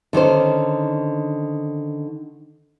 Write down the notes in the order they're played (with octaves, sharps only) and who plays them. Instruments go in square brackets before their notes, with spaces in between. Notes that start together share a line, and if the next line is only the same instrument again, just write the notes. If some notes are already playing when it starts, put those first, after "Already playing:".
[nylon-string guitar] D3 D#3 C#4 C5